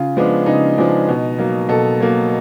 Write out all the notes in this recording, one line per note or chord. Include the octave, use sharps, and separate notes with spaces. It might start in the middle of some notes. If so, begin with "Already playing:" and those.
Already playing: C#3 F4
F3 G#3 B3 D4
C#3 D#4
F3 G#3 B3 D4
B2
F#3 A#3
B2 A4
F#3 A#3